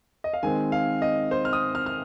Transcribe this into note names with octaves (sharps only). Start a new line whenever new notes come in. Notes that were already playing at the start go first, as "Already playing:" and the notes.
D#5
F5
D#3 G#3 C4 G#5
F5
D#5
C5
F6
D#6
F6
F6